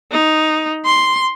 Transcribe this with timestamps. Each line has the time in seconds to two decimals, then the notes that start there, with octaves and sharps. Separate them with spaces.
0.12 D#4
0.86 C6